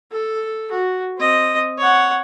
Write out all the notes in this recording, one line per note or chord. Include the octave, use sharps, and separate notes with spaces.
A4
F#4
C4 D#5
C#5 F#5